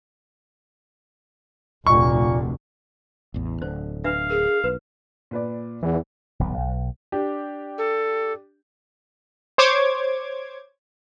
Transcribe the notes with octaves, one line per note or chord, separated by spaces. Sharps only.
F1 D2 A#2 C#6
A1 E2
D1 D3 C5
D4 B4 E5 F5
G#4 A#4
B1 B4
A#2 B4 D5
E2 E3
D#1 B1 B3
B1
D4 G4
A4
C5 C#5 D6 G#6